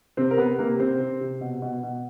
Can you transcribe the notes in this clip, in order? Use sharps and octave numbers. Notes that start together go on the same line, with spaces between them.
C3 C4 C5
A#4
C3 B3 B4
C3 A#3 A#4
C3 C4 C5
C3
C3
B2
B2
B2